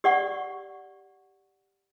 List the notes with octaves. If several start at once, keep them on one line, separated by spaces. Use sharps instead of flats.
G4 D5 F#5 C#6